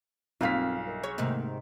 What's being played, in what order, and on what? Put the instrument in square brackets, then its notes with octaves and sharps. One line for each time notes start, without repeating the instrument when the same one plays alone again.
[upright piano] B1 F5 B6 [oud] G2 A#3 F4 [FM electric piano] C4
[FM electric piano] A#4 D#5 E5
[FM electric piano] G#4 [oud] C#5
[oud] G#2 C3 D#3 [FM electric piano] A3 A#3